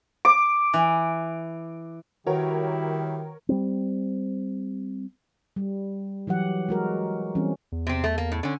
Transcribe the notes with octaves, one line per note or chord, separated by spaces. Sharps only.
D6
E3
D#3 G3 E4 F#4 G4 A#4 B4 C#5
G3 C4
G3
E3 F#3 G4 F#5
G#3 F#4 A#4
E3 G3 C4 C#4
E2
C3 C4
A3
A#3
A2
D3 C#4